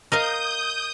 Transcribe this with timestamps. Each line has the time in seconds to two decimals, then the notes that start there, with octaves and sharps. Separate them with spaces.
0.12 A#4 D#5 F5 D#6 G6